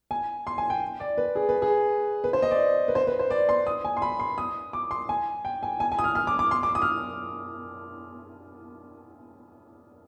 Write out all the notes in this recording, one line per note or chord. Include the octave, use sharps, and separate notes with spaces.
G#5
C6
G#5
G5
D5
B4
G#4
B4
G#4
B4
C5
D#5
D5
B4
C5
B4
C5
D5
C6
D#6
G#5
C6
B5
C6
D#6
D6
C6
G#5
G5
G#5
G#5
G#5
D#6
F6
F6
D6
D6
C6
D6
D#6
F6